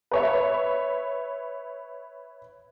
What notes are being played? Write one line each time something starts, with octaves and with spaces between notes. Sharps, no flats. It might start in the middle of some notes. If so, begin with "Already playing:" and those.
B4 C#5 E5